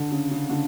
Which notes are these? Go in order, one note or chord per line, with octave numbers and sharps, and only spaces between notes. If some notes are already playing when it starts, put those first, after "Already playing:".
Already playing: D3
C#3
C#3
D3